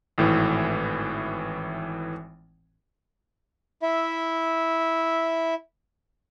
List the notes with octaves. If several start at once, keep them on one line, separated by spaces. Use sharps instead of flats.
G#1 A2 E3
E4 E5